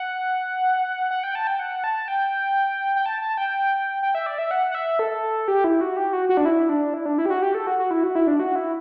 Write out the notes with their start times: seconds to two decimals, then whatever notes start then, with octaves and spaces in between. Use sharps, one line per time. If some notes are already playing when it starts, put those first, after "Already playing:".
Already playing: F#5
1.11 F#5
1.23 G5
1.35 A5
1.47 G5
1.59 F#5
1.84 A5
2.08 G5
2.96 G5
3.06 A5
3.22 A5
3.37 G5
4.03 G5
4.15 E5
4.26 D5
4.38 E5
4.51 F#5
4.71 F#5
4.75 E5
4.99 A4
5.48 G4
5.64 E4
5.81 F#4
5.97 G4
6.13 F#4
6.29 F#4
6.37 D4
6.45 E4
6.69 D4
6.94 E4
7.06 D4
7.18 E4
7.26 G4
7.30 F#4
7.42 G4
7.55 A4
7.67 F#4
7.79 F#4
7.91 E4
8.03 F#4
8.15 E4
8.27 D4
8.40 F#4
8.56 E4